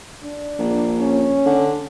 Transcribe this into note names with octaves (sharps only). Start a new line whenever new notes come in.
D4
A#1
C#4
D3